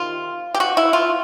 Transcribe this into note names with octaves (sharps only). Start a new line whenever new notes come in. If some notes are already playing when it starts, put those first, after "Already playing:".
Already playing: C3 D#3 F4
G4
F#4
E4
F4